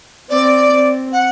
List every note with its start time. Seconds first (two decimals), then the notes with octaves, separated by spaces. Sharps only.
0.29 C4 D5
0.71 C4
1.12 F#5